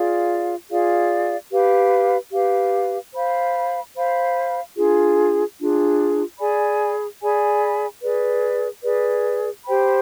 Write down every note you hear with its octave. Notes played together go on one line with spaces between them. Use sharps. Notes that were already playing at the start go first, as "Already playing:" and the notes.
Already playing: F4 G#4 D5 F5
F4 G#4 D5 F5
G4 B4 F5
G4 B4 F5
C5 F5 B5
C5 F5 B5
D4 F4 G#4
D4 F4 G#4
G#4 D5 G#5 B5
G#4 D5 G#5 B5
G#4 B4 D5
G#4 B4 D5
G4 C5 G5 B5